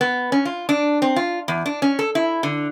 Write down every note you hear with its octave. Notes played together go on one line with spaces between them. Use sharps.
B3
C#4
F4
D4
C4
F4
E2
D4
C#4
A4
E4
D3